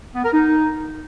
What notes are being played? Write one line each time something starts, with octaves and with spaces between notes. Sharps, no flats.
B3
A#4
D#4